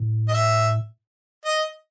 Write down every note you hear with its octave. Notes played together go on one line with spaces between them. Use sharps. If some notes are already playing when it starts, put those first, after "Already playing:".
Already playing: A2
D#5
E5
D#5